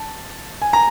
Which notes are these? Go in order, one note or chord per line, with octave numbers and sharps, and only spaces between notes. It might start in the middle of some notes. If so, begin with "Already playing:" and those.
Already playing: A5
G#5
A#5